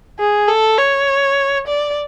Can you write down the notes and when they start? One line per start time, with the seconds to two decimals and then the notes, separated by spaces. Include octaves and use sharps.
0.19 G#4
0.49 A4
0.78 C#5
1.68 D5